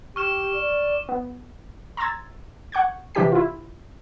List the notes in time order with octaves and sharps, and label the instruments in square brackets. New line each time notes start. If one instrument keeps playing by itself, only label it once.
[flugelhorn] G4 [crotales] C#6 F6 E7
[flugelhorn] D5
[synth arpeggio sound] B3
A#5 C6 E6 G#6 A6
F#5 C#6 G6 G#6
C3 E3 D4 G4 G5 B6
E4 F4